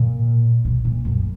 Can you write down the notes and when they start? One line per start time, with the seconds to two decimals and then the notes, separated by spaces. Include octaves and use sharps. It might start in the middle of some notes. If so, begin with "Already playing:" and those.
Already playing: A#2
0.65 B2
0.85 A#2
1.05 F#2